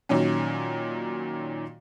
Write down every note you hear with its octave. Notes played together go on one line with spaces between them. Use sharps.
A#2 D#3 F#3 C#4